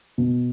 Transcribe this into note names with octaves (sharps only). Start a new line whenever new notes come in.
B2